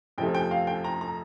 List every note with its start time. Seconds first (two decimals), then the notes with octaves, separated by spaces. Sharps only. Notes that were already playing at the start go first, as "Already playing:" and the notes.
0.18 F2 C3 F3 A3 G5
0.35 G5
0.51 F5
0.67 G5
0.84 A#5
1.01 A#5